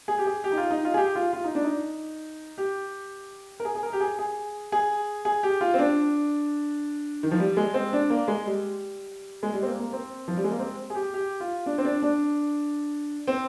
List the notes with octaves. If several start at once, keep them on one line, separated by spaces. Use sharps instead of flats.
G#4
G4
G#4
G4
D#4
F4
D#4
F4
G#4
G4
F4
F4
D#4
D4
D#4
G4
A#4
G#4
G#4
A#4
G4
G#4
G#4
G#4
G#4
G4
F4
C4
D4
D#3
F3
G3
G#3
C4
D4
A#3
G#3
G3
G#3
G3
C4
A#3
A#3
C4
F3
G3
G#3
A#3
C4
G#4
G4
G4
F4
D4
C4
D4
D4
C4